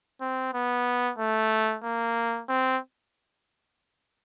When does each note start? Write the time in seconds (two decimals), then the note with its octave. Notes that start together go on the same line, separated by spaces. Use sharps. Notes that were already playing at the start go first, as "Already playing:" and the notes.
0.21 C4
0.54 B3
1.18 A3
1.84 A#3
2.49 C4